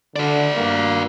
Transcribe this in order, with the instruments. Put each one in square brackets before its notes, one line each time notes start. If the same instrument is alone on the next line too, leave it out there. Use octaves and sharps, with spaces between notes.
[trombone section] D3 [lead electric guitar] F#4 D5
[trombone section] G2 G3 A#3